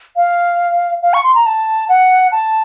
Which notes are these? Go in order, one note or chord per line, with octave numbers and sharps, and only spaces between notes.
F5
F5
C#6
C6
A#5
A5
F#5
A5